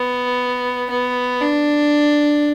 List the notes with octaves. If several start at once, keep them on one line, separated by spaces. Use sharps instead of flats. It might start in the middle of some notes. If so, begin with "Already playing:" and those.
Already playing: B3
B3
D4